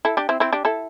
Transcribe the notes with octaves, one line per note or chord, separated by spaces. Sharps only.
E4 A4
D4 G4
C4 E4
C4 E4
D4 G4
E4 A4